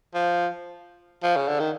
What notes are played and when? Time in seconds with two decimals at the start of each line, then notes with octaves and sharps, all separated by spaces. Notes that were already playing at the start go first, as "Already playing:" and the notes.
0.15 F3
1.23 F3
1.37 C#3
1.48 D3
1.60 D#3